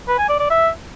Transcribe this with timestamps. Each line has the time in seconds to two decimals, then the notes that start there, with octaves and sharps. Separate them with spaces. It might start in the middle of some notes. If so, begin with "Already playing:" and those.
0.08 B4
0.19 G#5
0.29 D5
0.40 D5
0.50 E5